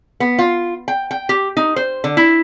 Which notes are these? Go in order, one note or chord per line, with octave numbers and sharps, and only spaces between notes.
B3
F4
G5
G5
G4
D#4
C5
D3
E4